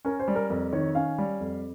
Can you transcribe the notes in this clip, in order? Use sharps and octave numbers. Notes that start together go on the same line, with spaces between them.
C#4 A#4
C5
G3
A#4
F2 A#4
D#3 C#5
C#4 F5
G3
F2